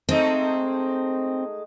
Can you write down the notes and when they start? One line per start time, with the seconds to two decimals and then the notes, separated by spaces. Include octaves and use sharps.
0.09 G#3 A3 C4 D#4